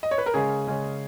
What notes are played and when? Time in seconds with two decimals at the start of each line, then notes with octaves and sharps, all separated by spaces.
0.03 D#5
0.11 C#5
0.18 B4
0.26 A#4
0.34 C#3 G#3 C#4 G#4
0.67 C#3 G#3 C#4